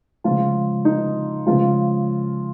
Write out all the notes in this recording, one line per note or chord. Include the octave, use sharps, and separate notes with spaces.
C#3 F3 G#3 F4
D#4
C#3 F3 G#3 F4